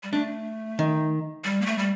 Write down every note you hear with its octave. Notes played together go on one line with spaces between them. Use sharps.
G3
A3 D4
D#3
G3
A#3
A3
G3